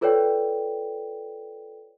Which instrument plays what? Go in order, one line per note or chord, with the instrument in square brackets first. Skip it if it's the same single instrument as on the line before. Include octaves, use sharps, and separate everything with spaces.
[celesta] F4 A4 B4 C#5 D5 G5